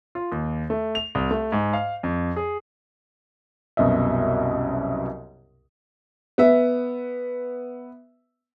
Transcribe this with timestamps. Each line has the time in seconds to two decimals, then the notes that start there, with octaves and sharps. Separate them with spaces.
0.15 F4
0.32 D#2
0.70 A3
0.95 F7
1.15 C2
1.31 A3
1.52 G#2
1.73 F5
2.03 F2
2.36 G#4
3.77 C2 F#2 B2 D#5 E5
6.38 B3 E5